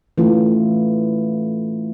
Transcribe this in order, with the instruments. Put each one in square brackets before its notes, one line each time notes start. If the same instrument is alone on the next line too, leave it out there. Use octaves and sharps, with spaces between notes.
[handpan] E3 A3 C#4 F4